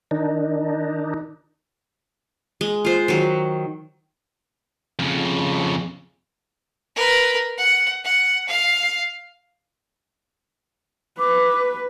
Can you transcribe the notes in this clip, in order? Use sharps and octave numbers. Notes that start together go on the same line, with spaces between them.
D#3 D4 D#4
G#3
F4 C5
D#3 F#3
F2 C#3
A#4 B4
F#5
F#5
F5
B4 D6